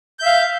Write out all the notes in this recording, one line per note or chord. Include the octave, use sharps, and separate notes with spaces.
E5 F5 G6